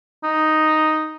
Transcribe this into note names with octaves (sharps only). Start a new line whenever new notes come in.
D#4